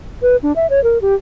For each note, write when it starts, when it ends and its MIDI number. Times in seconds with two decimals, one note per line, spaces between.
0.22 0.36 71
0.43 0.53 62
0.56 0.67 76
0.70 0.82 73
0.84 1.01 70
1.01 1.14 67